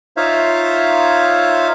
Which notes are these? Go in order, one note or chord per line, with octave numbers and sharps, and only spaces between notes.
D#4 F4 C5 C#5 E5 F5